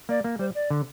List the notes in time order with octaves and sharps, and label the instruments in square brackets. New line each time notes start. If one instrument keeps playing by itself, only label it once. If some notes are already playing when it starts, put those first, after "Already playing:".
[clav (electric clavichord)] A#3 [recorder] D5
[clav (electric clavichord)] A#3
[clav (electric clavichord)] G3 [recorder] C5
[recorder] D5
[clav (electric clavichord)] D3